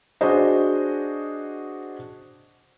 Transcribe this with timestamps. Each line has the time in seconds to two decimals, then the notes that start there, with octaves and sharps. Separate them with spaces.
0.21 D4 F#4 G#4 C5 D#5